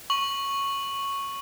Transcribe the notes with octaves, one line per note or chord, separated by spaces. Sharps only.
C#6 F#7